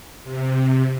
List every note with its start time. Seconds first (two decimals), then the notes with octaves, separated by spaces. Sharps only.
0.24 C3